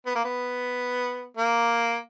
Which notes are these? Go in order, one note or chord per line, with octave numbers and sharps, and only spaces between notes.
B3
A#3
B3
A#3